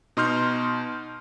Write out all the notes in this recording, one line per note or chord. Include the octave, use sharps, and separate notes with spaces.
B2 D#4 C6 F6 G6